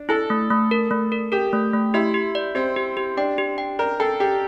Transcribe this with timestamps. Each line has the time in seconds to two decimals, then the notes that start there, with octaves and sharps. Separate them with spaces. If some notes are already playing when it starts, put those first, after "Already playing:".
Already playing: D4
0.09 E4 A4
0.30 A3
0.50 A3
0.71 A#4
0.91 A3
1.12 A#4
1.32 G4 A#4
1.53 A3
1.74 A3
1.94 E4 G4
2.14 G4
2.35 D5
2.55 C4 G4
2.76 G4
2.97 G4
3.17 D4 G5
3.38 G4
3.58 G5
3.79 A#4 D5
4.00 A4 G5
4.20 G4 G5